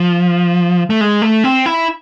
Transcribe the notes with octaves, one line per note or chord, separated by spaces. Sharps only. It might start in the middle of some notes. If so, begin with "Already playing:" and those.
Already playing: F3
A3
G#3
A3
C4
E4